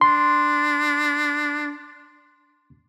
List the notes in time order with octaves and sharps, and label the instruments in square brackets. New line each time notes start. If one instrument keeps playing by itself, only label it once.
[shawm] D4 [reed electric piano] C6